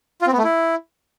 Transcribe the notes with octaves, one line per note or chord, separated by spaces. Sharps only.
F4
C4
B3
A3
E4